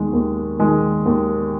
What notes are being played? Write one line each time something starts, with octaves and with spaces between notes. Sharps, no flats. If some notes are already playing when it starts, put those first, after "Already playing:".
Already playing: D#2 D#3 G#3
D#2
D#3 G#3
D#2